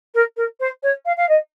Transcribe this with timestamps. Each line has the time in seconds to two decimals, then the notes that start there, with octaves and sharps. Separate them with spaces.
0.14 A#4
0.36 A#4
0.60 C5
0.83 C#5
1.05 F5
1.17 F5
1.28 D#5